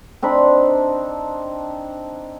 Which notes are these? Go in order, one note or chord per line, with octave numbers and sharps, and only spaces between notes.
C4 D4 D#4 B5